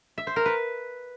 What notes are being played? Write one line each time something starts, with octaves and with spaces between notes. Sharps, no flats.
E5
C5
A#4
B4